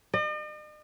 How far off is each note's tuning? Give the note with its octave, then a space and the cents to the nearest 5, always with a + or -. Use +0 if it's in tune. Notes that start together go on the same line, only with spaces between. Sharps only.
D#5 -45